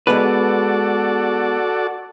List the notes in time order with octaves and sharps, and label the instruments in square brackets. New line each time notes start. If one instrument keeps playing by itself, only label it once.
[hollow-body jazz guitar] G#3 B3 B4 [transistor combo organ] F#4 A4 D5